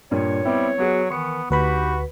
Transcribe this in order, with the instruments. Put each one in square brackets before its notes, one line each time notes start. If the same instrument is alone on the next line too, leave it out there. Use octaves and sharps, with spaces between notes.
[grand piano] G2 A#2 [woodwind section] C#5
[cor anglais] G3 [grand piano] B3 C4 E4
[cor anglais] F#3 [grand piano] B3 F#4 G#4
[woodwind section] D#3 E3 [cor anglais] B3 [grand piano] C#6 C#7
[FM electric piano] D2 B4 B5 [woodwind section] D4 D#4 G4 [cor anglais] F#4